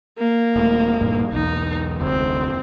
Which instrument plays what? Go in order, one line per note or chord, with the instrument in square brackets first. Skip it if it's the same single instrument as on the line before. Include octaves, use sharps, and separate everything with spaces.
[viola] A#3
[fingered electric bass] D#1 A3
D1 G2 A#2
[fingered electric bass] B1 E2 [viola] D#4
[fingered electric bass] F1 D2 [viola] C4